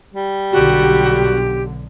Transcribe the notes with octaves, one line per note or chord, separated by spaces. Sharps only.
G3
B1 D3 F#4 G4